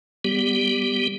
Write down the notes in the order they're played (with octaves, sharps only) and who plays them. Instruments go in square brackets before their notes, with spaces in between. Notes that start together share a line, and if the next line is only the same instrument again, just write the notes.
[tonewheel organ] G3 B3 G4